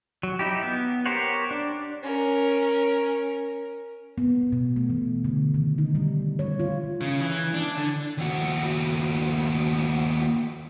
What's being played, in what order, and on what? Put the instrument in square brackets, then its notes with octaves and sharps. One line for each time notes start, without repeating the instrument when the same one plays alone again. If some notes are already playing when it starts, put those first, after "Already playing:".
[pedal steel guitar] F#3
D#4 E4 G4
B3
G4 A#4 C5 C#5 F#5
D4
[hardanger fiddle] C#4 A#4
[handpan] B3
B2
A3
E3
D3
D#3
D#4
G3
C#5
F4
[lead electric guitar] C#3
E3
D4
D3
D#2 F#4